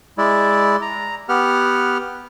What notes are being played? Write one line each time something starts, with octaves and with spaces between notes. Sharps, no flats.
G#3 E4 D5
A#5
B3 G4 F#5 F6